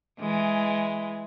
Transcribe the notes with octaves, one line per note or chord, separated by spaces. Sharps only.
E3 G#3